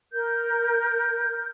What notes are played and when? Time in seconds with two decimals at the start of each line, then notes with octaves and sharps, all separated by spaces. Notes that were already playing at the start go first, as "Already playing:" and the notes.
0.12 A#4 G6